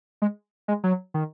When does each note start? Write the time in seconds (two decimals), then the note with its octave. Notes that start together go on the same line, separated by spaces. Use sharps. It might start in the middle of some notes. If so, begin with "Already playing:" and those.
0.22 G#3
0.68 G#3
0.84 F#3
1.14 D#3